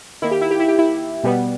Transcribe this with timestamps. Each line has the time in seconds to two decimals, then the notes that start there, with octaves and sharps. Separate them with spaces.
0.22 D#3 A#3 E4
0.31 G4
0.41 E4
0.51 G4
0.60 E4
0.68 G4
0.79 E4
1.24 B2 G3 B3